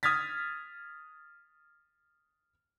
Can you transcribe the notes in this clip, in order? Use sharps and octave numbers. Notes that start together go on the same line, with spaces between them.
D#6 F6 G#6 A6 B6